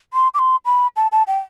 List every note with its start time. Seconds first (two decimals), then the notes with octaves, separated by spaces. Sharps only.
0.14 C6
0.34 D6
0.39 C6
0.65 B5
0.96 A5
1.12 A5
1.27 G5